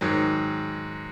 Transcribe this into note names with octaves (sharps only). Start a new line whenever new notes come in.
G#2 D#3 F#3